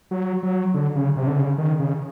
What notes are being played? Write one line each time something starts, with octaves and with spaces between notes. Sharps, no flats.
F#3
F#3
D3
C#3
C3
D3
C#3
D#3
C#3